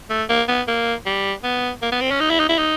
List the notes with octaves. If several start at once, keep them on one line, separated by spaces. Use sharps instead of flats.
A3
A#3
B3
A#3
G3
B3
A#3
B3
C4
C#4
D#4
E4
D#4
E4
D#4